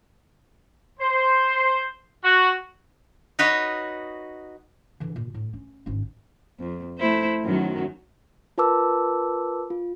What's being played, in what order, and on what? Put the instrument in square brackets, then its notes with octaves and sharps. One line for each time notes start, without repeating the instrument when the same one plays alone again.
[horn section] C5
F#4
[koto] D#4 F#4 B4 C#5 D#5
[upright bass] D3 E3
A#2
A2
C#4
G#1 C#4
[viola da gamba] F2
A3 E4 C5
F#2 D#3 F#3
[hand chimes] F4 A#4 B4 A5 D6 E6
F4